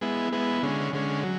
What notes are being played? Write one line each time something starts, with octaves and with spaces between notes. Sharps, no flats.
G#3 B3 E4
G#3 B3 E4
D3 G#3 C#4
D3 G#3 C#4
F#3